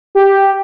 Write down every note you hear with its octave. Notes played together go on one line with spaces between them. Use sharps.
G4